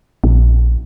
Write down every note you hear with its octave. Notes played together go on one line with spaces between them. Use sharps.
A#1